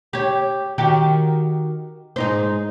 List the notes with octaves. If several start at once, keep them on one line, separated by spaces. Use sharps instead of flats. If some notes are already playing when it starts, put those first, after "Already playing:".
G4 C#5
D#3 F#4 G4
G#2 D#4 C5